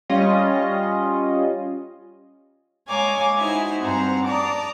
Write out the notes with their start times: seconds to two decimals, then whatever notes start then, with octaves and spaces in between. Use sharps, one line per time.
0.09 G3 C#4 F4 D#5
2.89 G#3 C#5 F5 G#5 A#5 D6
3.36 D#4 E4 F#4 C5 G#5
3.82 G2 C4 C5 F#5 A#5
4.25 D5 A5 A#5 D6 D#6